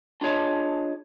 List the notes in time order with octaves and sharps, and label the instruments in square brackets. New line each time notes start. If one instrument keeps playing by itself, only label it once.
[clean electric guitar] D4 F4 G#4 C#5 D#5 A5